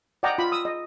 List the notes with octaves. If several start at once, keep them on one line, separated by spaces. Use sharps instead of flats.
D5 D#5 F#5 G5 A#5 D6
F4 B5
D#6 E6
D#5